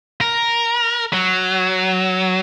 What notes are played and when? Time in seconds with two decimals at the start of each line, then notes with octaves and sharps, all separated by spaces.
0.21 A#4
1.13 F#3